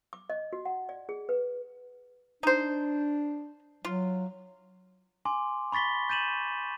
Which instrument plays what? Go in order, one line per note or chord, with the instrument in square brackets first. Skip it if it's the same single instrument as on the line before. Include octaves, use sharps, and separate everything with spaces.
[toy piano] D6
D#5
F#4
F#5
D5
G#4
B4
[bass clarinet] D4 [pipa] D#4 C5
[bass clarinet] F#3 [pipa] F4
[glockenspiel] G#5 C6 D6
B5 C#6 A6 B6 G7
G6 A6 D#7 E7 F#7